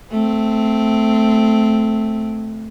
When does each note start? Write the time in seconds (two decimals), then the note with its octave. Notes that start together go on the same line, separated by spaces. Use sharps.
0.11 A3 C4